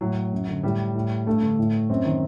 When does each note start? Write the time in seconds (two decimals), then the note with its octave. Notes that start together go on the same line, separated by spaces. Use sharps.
0.01 A2 F#3
0.32 F#2
0.48 D3
0.63 A2 G3
0.95 A2
1.27 G2 A3
1.42 D3
1.59 A2
1.89 F#2 C4
2.05 D#3